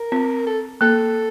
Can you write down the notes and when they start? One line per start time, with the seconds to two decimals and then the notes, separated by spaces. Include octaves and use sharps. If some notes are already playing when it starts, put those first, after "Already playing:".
Already playing: A#4
0.12 C4
0.47 A4
0.81 A#3 A4